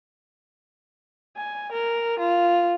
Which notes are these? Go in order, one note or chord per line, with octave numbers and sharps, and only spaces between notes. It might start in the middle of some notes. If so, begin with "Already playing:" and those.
G#5
A#4
F4